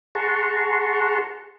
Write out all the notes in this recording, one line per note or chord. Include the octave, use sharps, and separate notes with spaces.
G#4 F#5 A5 A#5 C6 C#6